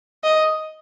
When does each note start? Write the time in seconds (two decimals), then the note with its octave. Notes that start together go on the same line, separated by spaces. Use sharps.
0.24 D#5